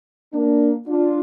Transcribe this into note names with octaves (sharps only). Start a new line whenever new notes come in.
A#3 D4
D4 F4